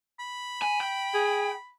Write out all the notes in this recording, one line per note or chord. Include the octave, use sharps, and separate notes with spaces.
B5
G#5
G5
G#4